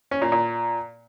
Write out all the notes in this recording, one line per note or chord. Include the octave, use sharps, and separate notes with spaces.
C#4
A#2
A#2